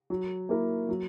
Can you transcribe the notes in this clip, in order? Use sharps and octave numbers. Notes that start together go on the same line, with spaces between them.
F#3
A#3 E4 A#4
F#3